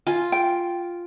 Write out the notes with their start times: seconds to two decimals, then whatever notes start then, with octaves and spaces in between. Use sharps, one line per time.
0.07 F4 G#5
0.32 G5